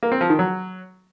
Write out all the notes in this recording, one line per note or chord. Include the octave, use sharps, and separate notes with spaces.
A#3
C4
F3
D#3
F#3